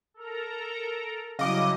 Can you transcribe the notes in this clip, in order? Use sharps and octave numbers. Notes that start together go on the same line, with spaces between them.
A4 A#4 A#5
C#3 F#3 G3 E4 D#5 F5 D6